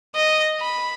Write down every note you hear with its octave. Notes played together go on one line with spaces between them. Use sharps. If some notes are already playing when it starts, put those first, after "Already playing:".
D#5
B5